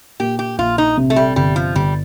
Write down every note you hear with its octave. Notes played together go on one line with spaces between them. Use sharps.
A#2 G4
G4
A#1 F4
D#4
C3
A3
G3
G1 G3
F3
G1 G3